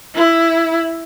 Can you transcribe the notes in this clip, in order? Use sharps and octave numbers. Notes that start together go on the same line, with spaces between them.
E4